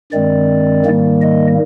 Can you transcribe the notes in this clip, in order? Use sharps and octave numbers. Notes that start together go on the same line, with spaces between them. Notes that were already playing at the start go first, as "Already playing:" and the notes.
G2 D#3 G#3 C4 D5
G#2 D#3 G3 A#3
D#5